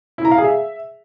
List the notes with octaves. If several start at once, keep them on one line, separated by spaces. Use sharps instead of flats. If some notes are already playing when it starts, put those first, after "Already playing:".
E4
A#5
F5
G#4
E5